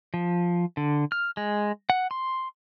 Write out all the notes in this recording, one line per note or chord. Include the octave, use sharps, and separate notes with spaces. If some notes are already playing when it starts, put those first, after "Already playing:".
F3
D3
F6
G#3
F#5
C6